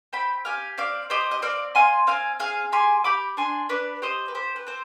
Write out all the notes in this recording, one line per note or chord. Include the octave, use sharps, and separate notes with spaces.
C4 G5 B5
G4 F5 G#5
C4 D5 F5
G4 C5 D#5
D#5
C4 D5 F5
F4 G#5 C6
C4 F5 G#5
G#4 F5 G#5
G4 G#5 C6
G4 B5 D6
D4 G#5 C6
D4 B4 D5
G4 C5 D#5
B4
G4 C5
B4
C4 C5